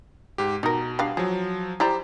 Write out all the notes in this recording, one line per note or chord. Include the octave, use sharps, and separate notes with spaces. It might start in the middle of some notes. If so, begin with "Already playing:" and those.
G#2 G4
B2 D#4 A#4
G3 D4 F5
F3 F#3 G#4
E4 G4 C5 D5 A#5